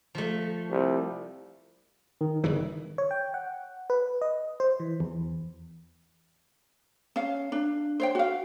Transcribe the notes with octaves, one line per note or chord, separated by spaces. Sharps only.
F3 A3
C2
D#3
G1 C#3 E3
C#5
G5
F#5
B4
D#5
C5
E3
E2
C#4 F5
D4
C5 C#5 G5
F#4 F5